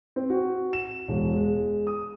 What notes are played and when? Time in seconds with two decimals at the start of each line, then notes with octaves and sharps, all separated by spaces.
0.16 C4
0.30 F#4
0.73 E7
1.08 E1
1.33 G#3
1.87 D#6